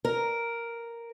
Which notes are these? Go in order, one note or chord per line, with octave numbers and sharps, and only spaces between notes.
A#4